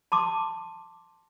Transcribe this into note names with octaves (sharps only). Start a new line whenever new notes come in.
A5 C6 D6